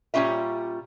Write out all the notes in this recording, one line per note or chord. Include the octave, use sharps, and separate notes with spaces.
A#2 G3 C#4 F4 E5